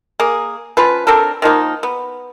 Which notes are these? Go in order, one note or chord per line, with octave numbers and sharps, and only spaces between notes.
A#3 G#4
F3 C#4 F4 B4
C4 D4 A4 A#4
D#3 F3 A#3 D#4
B3